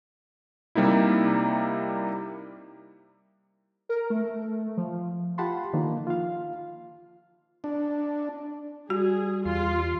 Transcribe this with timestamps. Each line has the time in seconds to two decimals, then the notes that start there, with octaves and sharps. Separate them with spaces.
0.75 C3 G3 A#3 D#4 E4
3.89 A#4
4.10 A3
4.77 F3
5.38 F4 G4 F#5 A5 B5 C6
5.73 D3 D#3 F3 A#3
6.07 F4 F5
7.64 D4
8.90 G3 F#4 G#4
9.45 E2 F4 C6